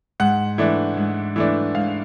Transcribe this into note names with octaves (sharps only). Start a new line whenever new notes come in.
G#2 F#5
E3 A3 D4
G#2
E3 A3 D4
G#2 F5